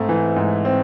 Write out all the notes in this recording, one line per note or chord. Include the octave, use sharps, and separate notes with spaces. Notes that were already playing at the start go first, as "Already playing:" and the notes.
Already playing: G#2 A3 C4
E3
G#2
C4